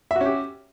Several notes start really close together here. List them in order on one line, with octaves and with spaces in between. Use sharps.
E5 F#4 C#4 G4